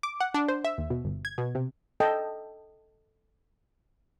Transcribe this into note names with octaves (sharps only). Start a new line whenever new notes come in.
D6
F#5
D4
C5
E5
D#2
B2
G1
G#6
B2
C3
A4 D#5 G5 A5